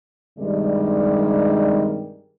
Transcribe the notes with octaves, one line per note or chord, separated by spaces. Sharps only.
G2 C3 D#3 G3 G#3 D5